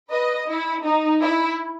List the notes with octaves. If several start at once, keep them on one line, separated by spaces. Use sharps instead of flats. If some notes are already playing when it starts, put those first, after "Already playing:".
B4 D#5
E4
D#4
E4